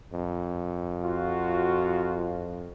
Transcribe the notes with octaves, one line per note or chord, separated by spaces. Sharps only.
F2
F4 F#4